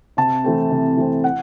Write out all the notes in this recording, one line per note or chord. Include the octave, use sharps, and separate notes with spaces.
C3 A5
E3 A3 C4
C3
E3 A3 C4
F#5